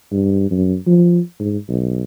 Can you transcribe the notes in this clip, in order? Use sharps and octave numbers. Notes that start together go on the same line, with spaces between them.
G2
F#2
F3
G#2
B1